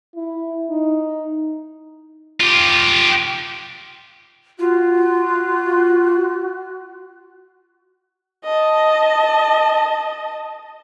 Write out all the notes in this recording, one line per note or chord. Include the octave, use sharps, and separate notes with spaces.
E4
D#4
F4 G4
F4 F#4
D#5 A5